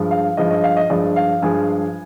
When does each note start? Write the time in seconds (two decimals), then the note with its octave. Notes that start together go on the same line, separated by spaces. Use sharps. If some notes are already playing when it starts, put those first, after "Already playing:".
Already playing: G2 F3 G#3
0.11 F5
0.37 G2 F3 G#3 D#5
0.51 D#5
0.64 F5
0.77 D#5
0.90 G2 F3 G#3 D5
1.16 F5
1.42 G2 F3 G#3 G#5